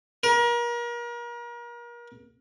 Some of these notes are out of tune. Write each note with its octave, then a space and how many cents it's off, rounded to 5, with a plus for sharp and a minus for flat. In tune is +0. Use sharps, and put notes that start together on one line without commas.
A#4 +35